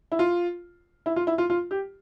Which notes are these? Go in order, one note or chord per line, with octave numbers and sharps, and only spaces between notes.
E4
F4
E4
F4
E4
F4
F4
G4